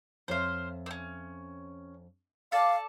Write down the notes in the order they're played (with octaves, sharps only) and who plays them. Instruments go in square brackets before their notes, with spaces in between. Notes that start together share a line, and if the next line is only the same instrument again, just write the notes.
[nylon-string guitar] F2 C#5 E5 [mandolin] C5 F5
[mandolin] C4 C#4
[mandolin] A4 D5 A5 [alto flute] F5